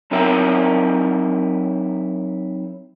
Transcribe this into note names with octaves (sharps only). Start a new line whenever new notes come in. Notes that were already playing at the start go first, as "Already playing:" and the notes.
F#3 C4 D#4 E4 A#4 E5